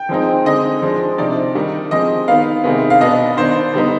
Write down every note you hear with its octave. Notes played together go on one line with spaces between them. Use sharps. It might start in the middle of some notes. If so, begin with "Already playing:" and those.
Already playing: G5
F3 G#3 C4 D#4
D3 G#3 C4 D#4 D#5
F3 G#3 D4
C3 F3 C4 D#4 D5
D#3 G3 D4
F3 G#3 C4 D#5
D#3 B3 D#4 F5
C3 D#3 G#3 B3
F5
B2 B3 D4 D#5
D#3 B3 D4 C5
D3 G3 B3 D#4